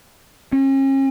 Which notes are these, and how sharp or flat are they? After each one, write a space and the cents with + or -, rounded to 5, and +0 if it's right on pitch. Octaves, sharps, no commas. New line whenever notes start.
C#4 -40